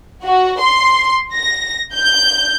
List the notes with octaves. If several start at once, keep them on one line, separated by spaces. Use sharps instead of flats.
F#4
C6
A#6
G6